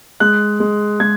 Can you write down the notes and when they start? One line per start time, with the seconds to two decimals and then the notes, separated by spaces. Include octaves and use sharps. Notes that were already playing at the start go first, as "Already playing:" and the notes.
0.20 G#3 F#6
0.60 G#3
1.00 G#3 G#6